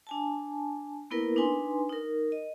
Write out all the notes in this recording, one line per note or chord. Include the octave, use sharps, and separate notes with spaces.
D4 G#5 A5
A#3 B3 E4 A#4 B4
D4 D#4 B4 G#5 C6
D#4 A#4
D#5